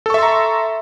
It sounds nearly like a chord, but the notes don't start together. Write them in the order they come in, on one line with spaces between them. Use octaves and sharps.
A4 C#6 E5 C6 A#5